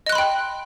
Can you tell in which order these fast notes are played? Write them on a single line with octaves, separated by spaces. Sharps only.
D#5 F#6 C6 B5 G5